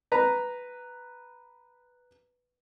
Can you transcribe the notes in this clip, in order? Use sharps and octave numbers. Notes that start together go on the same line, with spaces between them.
B4 A#5